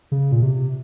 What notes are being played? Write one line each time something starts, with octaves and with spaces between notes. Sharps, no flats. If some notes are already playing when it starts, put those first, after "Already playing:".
C#3
A#2
C3